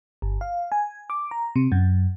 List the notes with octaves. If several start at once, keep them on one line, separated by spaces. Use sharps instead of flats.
G1
F5
G#5
D6
A#5
C3
F#2